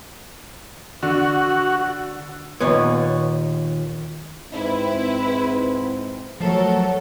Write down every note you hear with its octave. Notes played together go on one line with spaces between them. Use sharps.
D3 F#4
D#2 A#2 B3 C#5
G#2 C4 E4 B4
F3 F#3 A3 A4 A#4